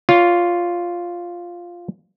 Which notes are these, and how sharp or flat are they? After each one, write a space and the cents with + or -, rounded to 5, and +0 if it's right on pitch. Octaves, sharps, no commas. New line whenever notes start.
F4 +0 C#5 +25